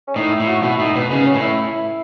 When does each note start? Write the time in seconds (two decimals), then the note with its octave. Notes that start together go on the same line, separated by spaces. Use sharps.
0.07 C#4
0.16 A2 D#4
0.32 E4
0.40 A2
0.48 F#4
0.63 B2 E4
0.79 A2 D#4
0.95 B2 B3
1.10 C#3 B3
1.26 C#4
1.34 A2
1.41 E4
1.58 E4